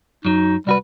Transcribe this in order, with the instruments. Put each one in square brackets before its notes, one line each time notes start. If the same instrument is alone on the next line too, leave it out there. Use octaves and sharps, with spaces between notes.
[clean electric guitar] F#2 F#3 [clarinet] D#4
[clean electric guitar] C2 F#4 B4 [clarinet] G3